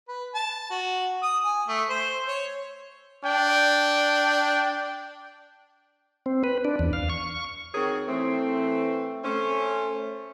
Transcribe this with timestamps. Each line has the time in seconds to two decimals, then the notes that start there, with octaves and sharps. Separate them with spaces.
0.08 B4
0.34 A5
0.70 F#4
1.23 D#6
1.44 G#5
1.68 A3
1.89 C5
2.27 C#5
3.24 D4 G5
6.26 C4
6.44 B4
6.65 D4
6.79 E2
6.93 F5
7.10 C#6
7.74 D#3 C4 F#4 G#4 A#4 C#5
8.08 E3 A3 C4
9.24 A3 C#4 C5